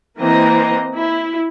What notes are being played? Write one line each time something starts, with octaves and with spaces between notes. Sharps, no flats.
E3 A#3 C4 D#5 A#5
E4